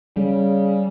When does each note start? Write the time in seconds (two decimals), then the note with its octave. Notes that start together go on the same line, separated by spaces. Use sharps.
0.17 C#3 G3